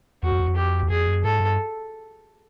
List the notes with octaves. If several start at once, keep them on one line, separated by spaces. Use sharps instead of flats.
E2 F#4
F2
E2
F2
G4
E2
F2 G#4
F#2
G#2 A4
G2